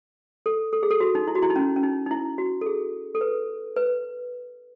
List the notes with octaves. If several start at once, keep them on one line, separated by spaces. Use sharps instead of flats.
A4
A4
G#4
A4
F#4
D#4
E4
F#4
E4
D#4
C#4
C#4
D#4
D#4
E4
F#4
A4
G#4
A4
B4
B4